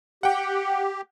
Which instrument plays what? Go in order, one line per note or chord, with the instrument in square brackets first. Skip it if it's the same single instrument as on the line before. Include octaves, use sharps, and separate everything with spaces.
[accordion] G4 [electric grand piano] F#5 G5